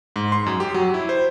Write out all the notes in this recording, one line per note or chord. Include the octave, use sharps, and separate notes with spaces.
G#2
C6
F#2
G4
F#3
E4
C5